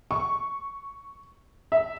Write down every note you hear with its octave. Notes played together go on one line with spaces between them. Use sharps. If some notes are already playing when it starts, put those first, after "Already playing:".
C#6
E5